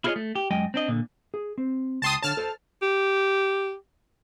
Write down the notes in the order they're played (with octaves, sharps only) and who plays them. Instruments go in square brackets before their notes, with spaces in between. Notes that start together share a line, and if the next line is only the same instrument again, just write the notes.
[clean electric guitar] E4 F4 G#4 A#4 C#5 D#5
A3
G4
F#2 G#3 D#5 G5
C4 D4 D#5
A#2 D3
[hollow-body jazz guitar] G#4
C4
[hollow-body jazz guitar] C#2 G5 [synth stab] A5 C6 D#6
[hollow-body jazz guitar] D3 C#5 [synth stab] A5 F6
[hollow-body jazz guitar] A4 C5
[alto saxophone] G4